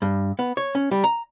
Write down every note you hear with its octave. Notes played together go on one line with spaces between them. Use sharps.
G2
B3
C#5
C#4
G3
A#5